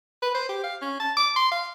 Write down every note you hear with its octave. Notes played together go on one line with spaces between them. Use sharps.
B4
C5
G4
F5
C#4
A5
D6
C6
F5